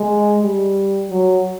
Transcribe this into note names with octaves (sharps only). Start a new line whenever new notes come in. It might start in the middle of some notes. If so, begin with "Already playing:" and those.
Already playing: G#3
G3
F#3